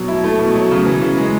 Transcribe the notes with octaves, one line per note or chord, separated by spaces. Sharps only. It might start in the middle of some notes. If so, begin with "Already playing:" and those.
Already playing: B2 F#3
E4
A3
B2
F#3
C#3
E3
C#3
G#3